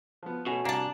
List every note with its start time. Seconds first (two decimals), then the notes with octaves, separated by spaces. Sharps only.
0.23 F3 B3
0.46 B2 A3 C#4 F#4 G#5
0.65 C2 A#3 D4 A5